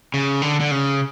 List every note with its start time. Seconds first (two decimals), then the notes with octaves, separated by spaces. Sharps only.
0.14 C#3
0.42 D3
0.60 D3
0.71 C#3